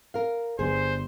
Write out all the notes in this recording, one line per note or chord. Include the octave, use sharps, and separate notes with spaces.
A#4 F5
G1 G2 G#4 C5